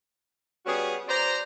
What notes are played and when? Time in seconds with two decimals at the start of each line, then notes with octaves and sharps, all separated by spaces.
0.66 G3 B3 C#4 F#4 G#4
1.08 C5 D5 A#5